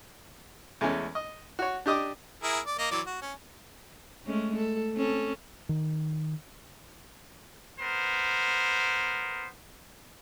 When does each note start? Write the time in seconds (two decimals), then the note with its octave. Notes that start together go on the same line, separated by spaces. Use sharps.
0.81 E2 G#3 A3 C#4
1.15 D#5
1.59 F#4 C#5
1.86 D4 G4 D#5 D6 D#6
2.43 E4 G#4 A#4
2.66 D5
2.79 A#3 D#5
2.91 E3 F#3 D5
3.07 F#4
3.22 C#4
4.26 G#3 A3 C#4
4.56 A4
4.95 C4 C#4 A4
5.69 D#3
7.80 B3 A#4 C5